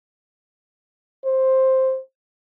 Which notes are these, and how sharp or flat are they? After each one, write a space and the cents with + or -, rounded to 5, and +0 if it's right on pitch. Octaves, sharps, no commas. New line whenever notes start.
C5 +5